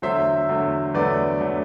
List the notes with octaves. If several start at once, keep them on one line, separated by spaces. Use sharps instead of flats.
E2 D3 F#3 A3 C5 E5
E2 D3 F#3 A3
E2 D3 F#3 A3 B4 D5
D3 F#3 A3